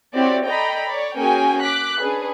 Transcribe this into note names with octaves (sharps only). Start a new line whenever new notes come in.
C4 E4 F#4 G4 C#5 D5
A4 D5 D#5 G5 A#5 B5
C#5 D5
A#3 C#4 F#4 G#4 G5 G#5
D6 F#6 B6
C#4 D4 G#4 B4